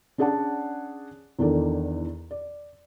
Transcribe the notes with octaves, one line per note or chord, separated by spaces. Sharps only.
C#4 D4 G#4 D5 F#5 A5
E2 D#3 D4 A4
D5